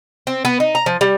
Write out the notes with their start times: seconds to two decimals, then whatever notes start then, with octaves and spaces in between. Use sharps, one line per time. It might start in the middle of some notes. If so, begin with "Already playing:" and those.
0.27 C4
0.45 B3
0.60 D#4
0.75 A#5
0.86 F3
1.01 G3